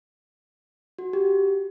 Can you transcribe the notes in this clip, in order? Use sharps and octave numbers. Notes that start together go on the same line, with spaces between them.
F#4
G4